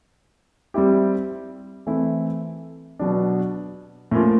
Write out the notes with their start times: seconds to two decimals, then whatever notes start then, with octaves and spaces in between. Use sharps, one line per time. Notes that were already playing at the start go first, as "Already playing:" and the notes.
0.74 G3 C4 E4 G4
1.87 E3 A3 C4 E4
2.99 B2 F#3 B3 D4
4.11 A2 F3 A#3 C#4 F4